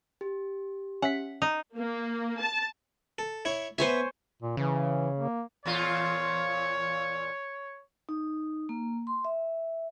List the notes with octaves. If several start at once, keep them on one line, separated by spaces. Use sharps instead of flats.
G4
C#4 E5 F#5 B6
D#4
A#3
A5
A4
E4 C#5
B3 C5 C#5 E5 G#5
A#2
C#3 E3
A#3
E2 A#2 F4 C#5
D#4
A#3
C6
E5